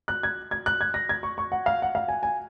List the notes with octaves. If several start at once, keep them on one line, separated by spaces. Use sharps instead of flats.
F#6
G#6
G#6
F#6
G#6
A#6
G#6
C#6
C#6
F#5
F5
F#5
F5
G#5
G#5